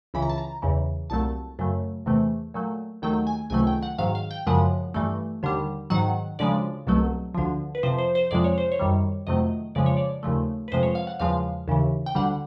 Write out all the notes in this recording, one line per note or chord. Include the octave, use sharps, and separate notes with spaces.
C#2 C#3 E3 B5
A#5
A5
A#5
E2 C#3 E3
C2 A#2 F#3 A3 A5
F#2 C#3 F#3 A3
E2 C3 E3 A3
A#2 F#3 A3
D#2 D#3 F#3 A3 G5
G#5
C#2 C3 D#3 F#3 A3 G#5
G5
F#5
G#2 D#3 F#3 F5
F5
G5
F#2 C#3 F3 G#3 F#5
G2 E3 A3
D#2 D3 G3
G#2 D#3 F#3 F#5
D2 C#3 F3 G#3 D5
C2 B2 F#3 A3
D2 D3 F3
B4
F2 C3 F3 C5
C5
C5
F2 C3 F3 G#3 D5
C#5
C5
C#5
F#2 D#3 G3
F2 C3 D#3 F#3 A3 D#5
F2 C#3 F3 G#3 D5
C#5
D5
D#2 C#3 F3 A3
B4
F2 C3 F3 G#3 C5
C#5
F5
F#5
E2 C#3 F3 G#3 F5
D#2 C#3 E3
G5
D2 D3 G3 F#5